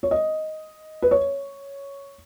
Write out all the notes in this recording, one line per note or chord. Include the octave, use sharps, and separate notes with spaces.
C#5
D#5
B4
C#5